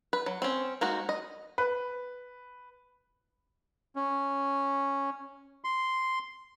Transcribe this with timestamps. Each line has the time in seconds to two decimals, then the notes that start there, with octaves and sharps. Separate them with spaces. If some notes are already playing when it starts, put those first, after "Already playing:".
0.13 B4
0.26 F#3
0.42 C4 C#4
0.81 G#3 A#3 D#4 F#4
1.09 D#5
1.58 B4
3.96 C#4
5.64 C6